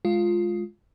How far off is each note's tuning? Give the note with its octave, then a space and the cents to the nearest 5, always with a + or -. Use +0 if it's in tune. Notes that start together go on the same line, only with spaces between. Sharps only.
G#3 +5 F4 +0